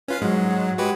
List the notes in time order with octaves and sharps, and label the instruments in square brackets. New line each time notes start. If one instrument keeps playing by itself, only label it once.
[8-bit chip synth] C#4 F4 F5 [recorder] B4
[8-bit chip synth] G#2 G#3 [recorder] F#3
[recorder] G#3 [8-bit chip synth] F#4 G4 B4